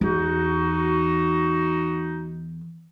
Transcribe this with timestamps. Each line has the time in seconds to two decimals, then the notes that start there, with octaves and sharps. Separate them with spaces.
0.01 E2 D#4 F#4